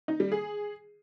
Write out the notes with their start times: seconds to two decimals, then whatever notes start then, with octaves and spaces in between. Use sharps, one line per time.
0.08 D#4
0.20 G3
0.32 G#4